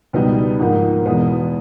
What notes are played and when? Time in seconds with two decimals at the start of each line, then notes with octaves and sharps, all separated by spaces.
0.13 C#2 B2 G3 B3 D#4
0.59 G#2 F3 A#3 D#4
1.06 E2 B2 G#3 B3